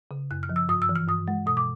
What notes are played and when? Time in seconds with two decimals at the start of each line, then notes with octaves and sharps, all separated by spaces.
0.11 C#3
0.31 F#2 F#6
0.43 F6
0.49 F3
0.56 E6
0.69 G2 D#6
0.82 E6
0.89 E3
0.96 F6
1.08 G2 D#6
1.28 G#3
1.46 B2 D#6
1.57 D6